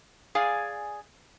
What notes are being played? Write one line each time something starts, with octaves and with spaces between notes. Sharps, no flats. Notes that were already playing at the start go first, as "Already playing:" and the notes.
G#4 D5 F5 G#5